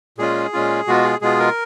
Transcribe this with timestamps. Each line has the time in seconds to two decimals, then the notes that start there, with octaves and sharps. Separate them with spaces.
0.18 A#2 G#3 C#4 F4 G#4
0.53 A#2 G#3 C#4 F4
0.87 B2 G#3 B3 F4 F#4
1.05 G#4
1.21 B2 G#3 B3 F4 G#4
1.39 A#4